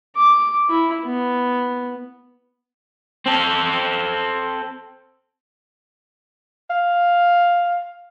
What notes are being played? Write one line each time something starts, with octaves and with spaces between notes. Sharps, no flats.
D6
E4
B3
C4 A4
F5